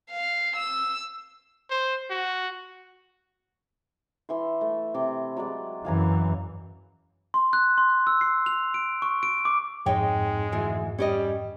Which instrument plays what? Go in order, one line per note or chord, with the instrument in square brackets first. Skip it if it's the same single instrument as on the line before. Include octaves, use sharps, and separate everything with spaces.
[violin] F5
E6
[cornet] C5
F#4
[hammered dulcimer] E3 E5 C6
A3
C3 C6 D6
F#3 G#3 D5
[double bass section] F#2 E3 [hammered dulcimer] F5 G#5 A#5
[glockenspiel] C6
F#6
C6
E6
C7
F7
D7
C#6
D7
D6
[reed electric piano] F2 G#2 [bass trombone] G#3 [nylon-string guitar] D#4 C#5 G5
[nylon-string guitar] D2 E3 G#5
[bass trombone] G3 [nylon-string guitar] C#4 G4 D#5